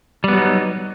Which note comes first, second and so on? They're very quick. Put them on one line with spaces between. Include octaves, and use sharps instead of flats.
G3 B3 F#3 D#4